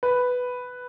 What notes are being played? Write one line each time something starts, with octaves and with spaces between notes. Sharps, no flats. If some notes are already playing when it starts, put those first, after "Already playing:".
B4